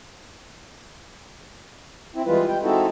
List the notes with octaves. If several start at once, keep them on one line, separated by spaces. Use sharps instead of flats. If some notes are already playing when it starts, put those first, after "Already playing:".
C4 E4
E3 G3 G#3 F4 B4
G5
G#3 C4 D#4 E4 F#4 A4